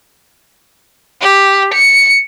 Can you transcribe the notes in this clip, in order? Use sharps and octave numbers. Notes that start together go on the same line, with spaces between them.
G4
C#7